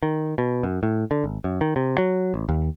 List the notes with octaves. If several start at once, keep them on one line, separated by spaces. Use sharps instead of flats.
D#3
B2
F#2
A2
D3
G#1
F#2
D#3
C3
F#3
A1
D#2